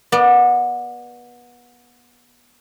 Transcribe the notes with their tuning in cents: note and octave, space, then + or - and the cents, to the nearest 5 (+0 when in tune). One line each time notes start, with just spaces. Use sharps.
B3 -25 D5 +15